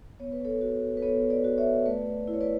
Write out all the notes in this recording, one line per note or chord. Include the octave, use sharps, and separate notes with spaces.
B3 C#5
B4
A4 C#5
F#4
B4
B3 A4 C#5
B4 D5
F#4
C#5 E5
A3 B4 D5
E4
C#5
B4 D5